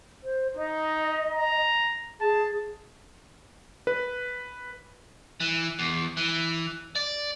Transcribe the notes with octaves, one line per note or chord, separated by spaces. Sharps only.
C5
D#4 D#5
A#5
G#4 A5
B4
E3
E2
E3
D5